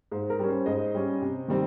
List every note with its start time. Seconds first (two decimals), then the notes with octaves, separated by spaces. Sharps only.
0.12 G#2 C5
0.30 A#4
0.39 G3 C#4
0.49 C5
0.66 G#2 C5 D#5
0.94 G3 C#4
1.22 C3
1.48 D#3 G3 C4